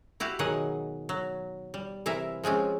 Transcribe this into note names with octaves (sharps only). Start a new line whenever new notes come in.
E4 F#4 G4 F5
B2 D#3 F#3 G#4 F#5
F#3
G3
C3 E3 E4 A#4 E5
F3 G#3 C4 C#4